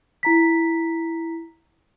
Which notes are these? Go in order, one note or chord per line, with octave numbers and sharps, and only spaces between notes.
E4 A#5 B6